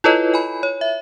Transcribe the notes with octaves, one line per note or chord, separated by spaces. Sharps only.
E4 F4 A4 B4 C#5 D#5
G#5 B5
C#5
E5